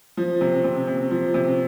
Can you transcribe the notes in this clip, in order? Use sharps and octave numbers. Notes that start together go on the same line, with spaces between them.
F3
C3
C3
C3
F3
C3